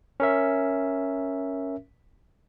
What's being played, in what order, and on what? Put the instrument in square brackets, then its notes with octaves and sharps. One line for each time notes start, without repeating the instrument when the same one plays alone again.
[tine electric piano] C#4 A#4 E5